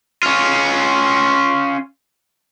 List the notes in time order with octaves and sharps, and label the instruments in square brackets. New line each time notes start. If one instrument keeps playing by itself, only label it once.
[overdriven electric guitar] C#4 F4